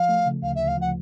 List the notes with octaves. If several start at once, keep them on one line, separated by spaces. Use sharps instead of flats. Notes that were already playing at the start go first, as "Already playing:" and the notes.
Already playing: F3 F5
A3
C#3
D2 F5
E5
D2
F5
F3 F#5